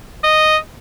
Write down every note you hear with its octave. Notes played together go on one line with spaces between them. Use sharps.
D#5